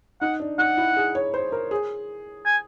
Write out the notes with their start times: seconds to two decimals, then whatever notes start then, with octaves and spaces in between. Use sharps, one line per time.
0.21 D#4 F#5
0.40 D4
0.58 D#4 F#5
0.77 E4
0.96 G#4
1.15 C#5
1.34 C5
1.52 A#4
1.71 G#4
2.45 G#5